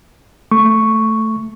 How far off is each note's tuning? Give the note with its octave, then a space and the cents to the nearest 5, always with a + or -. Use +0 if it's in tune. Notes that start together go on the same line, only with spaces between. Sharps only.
A3 +0 C#6 +0